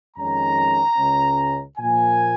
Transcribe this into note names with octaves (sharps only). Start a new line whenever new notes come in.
F2 D#3 G#3 C#4 A#5
C#2 C#3 G#3 C#4
A#2 F3 A#3 G#5